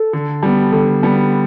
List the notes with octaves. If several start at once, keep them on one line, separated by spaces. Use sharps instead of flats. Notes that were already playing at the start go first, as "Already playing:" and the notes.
Already playing: A4
D3
G3 B3
D3
G3 B3